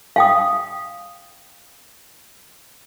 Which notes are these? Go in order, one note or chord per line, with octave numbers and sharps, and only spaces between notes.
F5 G5 D#6